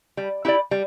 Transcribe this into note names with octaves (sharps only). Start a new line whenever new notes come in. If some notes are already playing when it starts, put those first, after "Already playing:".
G3
E4 G4 D5
G3